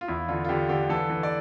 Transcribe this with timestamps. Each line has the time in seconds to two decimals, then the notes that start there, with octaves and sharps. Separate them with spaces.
0.01 F4
0.08 E2 E4
0.28 D3 F4
0.44 F4
0.49 D3 G4
0.69 D3 G4
0.89 E3 A4
1.10 E3
1.23 D5